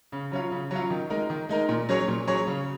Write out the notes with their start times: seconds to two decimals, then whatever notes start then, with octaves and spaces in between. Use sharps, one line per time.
0.12 C#3
0.32 F#3 C#4 F4
0.51 C#3
0.71 F#3 C#4 F4
0.90 D#3
1.10 G#3 D#4 A#4
1.30 D#3
1.49 G#3 D#4 A#4
1.69 A#2
1.89 F#3 C#4 G#4 C#5
2.08 A#2
2.27 F#3 C#4 G#4 C#5
2.47 C#3